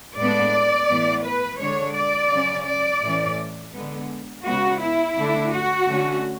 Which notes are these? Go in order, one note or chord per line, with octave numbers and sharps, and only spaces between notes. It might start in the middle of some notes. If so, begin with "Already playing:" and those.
A2 G#3 B3 D4 D5
A2 E3 B3
B4
D3 G#3 D4 C#5
D5
C#3 F#3 C#4
D5
A2 E3 A3 C#4
D3 G#3 B3
C#3 G#3 B3 F#4
E4
D3 A3 D4
F#4
D3 A3 C#4